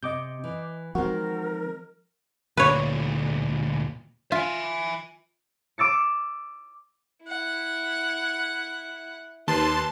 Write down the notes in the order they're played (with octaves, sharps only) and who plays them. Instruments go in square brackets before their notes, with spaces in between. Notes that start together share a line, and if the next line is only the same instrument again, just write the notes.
[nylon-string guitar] C3 [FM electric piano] D#5 D6 G6
[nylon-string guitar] E3
[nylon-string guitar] D#3 C4 [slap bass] F3 G#3 [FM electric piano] F#4 [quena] A#4
[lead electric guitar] D2 A#2 [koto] B4 C#5
[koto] F4 [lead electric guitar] E5 G#5
[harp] D6 E6 A6 C#7
[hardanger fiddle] E4 F#5
[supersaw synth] D#2 A5 C6 [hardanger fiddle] B4